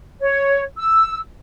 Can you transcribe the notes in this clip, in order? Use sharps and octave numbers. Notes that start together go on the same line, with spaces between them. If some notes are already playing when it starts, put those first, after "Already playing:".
C#5
E6